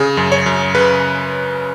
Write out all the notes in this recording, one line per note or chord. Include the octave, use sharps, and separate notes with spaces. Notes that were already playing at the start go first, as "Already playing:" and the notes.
Already playing: C#3 G#4
F#2
C#5
F#2
C#3 B4